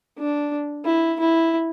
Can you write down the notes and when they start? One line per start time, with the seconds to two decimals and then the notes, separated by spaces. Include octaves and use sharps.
0.18 D4
0.85 E4
1.20 E4